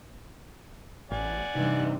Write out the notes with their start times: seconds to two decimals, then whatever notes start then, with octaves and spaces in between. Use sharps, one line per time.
1.11 A1 D5 F#5 G#5
1.55 G2 C3 E3 G3 D#4